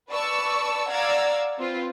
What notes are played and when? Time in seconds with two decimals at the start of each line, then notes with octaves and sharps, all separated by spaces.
0.10 B4 D5 A5 C#6 E6
0.90 D5 F5 F#5 A#5 E6 G#6
1.58 C4 F4 B4